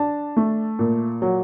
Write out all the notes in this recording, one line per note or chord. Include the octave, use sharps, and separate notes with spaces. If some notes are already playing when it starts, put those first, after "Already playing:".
Already playing: D4 A5
A3
A#2
F#3